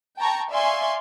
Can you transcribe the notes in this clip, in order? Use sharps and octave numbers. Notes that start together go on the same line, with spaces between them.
G5 A5 A#5 C#6
D5 E5 F5 G#5 C6 C#6